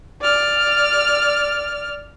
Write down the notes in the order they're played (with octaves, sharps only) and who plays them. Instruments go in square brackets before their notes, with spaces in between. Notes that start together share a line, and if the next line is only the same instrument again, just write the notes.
[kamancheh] D5 F6